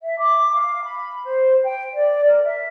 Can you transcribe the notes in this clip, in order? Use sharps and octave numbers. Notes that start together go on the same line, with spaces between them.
E5
D6
F5
B5
C5
G5
D5
A#4
E5